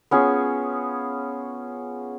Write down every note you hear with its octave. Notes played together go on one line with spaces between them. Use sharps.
B3 C#4 F4 G#4